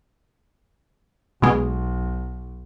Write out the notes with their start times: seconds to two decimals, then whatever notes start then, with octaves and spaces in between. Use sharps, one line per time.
1.42 B1 B2 G#3